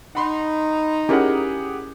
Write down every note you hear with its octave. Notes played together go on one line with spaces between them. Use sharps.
D#4 F#5 B5 C6
C#4 E4 G4 G#4 A#4 F#5